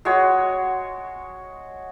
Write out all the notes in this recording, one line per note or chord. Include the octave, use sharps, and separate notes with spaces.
G#3 F#4 C#5